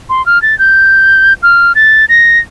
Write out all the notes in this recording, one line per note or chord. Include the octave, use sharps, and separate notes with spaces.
C6
F6
A6
G6
F6
A6
A#6